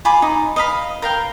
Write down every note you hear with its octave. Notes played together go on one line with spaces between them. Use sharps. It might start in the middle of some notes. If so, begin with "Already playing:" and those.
F4 G#5 B5 D6
D#4
D#5 F5 B5
A#4 F5 G5